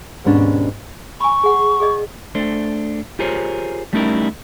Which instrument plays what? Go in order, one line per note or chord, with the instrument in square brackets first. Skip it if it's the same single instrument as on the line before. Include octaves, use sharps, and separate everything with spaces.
[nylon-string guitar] D#2 G#2 B2 C#4 D4
[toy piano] G#5 B5 [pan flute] C#6
[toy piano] G#4 F#5
G#4 D5 D#5
[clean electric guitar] A3 D4 C5
F4 G4 G#4 A#4 C5 C#5
G3 A3 C#4 D#4 E4 A#4